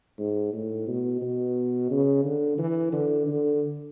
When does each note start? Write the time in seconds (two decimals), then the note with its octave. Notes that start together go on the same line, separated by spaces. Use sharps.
0.19 G#2
0.53 A2
0.88 B2
1.22 B2
1.91 C#3
2.25 D3
2.58 E3
2.92 D3
3.27 D3